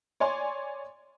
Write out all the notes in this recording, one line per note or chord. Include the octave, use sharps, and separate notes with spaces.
C#5 D5 G#5 C6